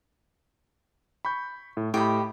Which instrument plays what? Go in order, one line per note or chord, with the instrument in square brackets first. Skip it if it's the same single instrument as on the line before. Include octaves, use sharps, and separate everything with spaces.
[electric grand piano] B5 C#6 G6
A2
[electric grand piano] A2 [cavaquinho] G4 D#5 B5